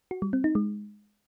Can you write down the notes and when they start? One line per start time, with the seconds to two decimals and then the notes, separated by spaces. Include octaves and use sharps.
0.11 F#4
0.22 G3
0.33 C4
0.44 D#4
0.55 G#3